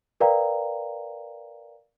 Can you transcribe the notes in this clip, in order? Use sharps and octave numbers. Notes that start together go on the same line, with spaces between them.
A#4 B4 D5 F5 G5 A#5